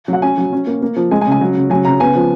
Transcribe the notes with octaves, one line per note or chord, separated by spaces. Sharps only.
F#3 F#5
C#4 G#5
F#3
C#4
A#3
A#3
F3
G#3 G#5
G#5
C#3
G#5
F#3
C#3
F#3 G#5
C#3 A#5
B3 G#5
F3